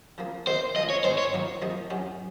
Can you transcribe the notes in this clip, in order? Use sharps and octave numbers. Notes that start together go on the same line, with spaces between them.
C#3 F3 A#3
C3 D#3 A#3 D#4 C5
C#3 F3 G#3 D#5
C#5
G#2 D#3 G#3 C4 C5
C#5
F#2 D#3 A#3 F4
C3 F3 A#3 D#4
F2 C3 F#3 C#4